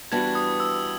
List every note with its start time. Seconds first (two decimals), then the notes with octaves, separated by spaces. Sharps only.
0.12 E3 G3 B3 D4 F#4 G#6
0.35 D#6
0.60 E6